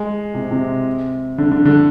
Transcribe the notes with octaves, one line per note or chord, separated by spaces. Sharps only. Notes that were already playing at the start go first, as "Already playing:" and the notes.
Already playing: G#3
C3
C3
D3
D3
D3